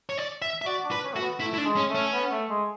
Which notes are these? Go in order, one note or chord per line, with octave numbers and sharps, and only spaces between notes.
C#5
D5
E5
E5
F#4 D5
D4
B4
C#4
A3 F#4
B3
A3 E4
E4
D4
G#3
C#4
A3
C#4
B3
A3
G#3